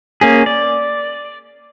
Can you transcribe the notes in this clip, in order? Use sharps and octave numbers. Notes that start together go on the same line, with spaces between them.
A#3 C#4 G#4
D5